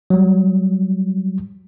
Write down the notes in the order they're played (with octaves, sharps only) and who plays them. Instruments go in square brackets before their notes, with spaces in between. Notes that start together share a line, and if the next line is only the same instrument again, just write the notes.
[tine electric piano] F#3 G3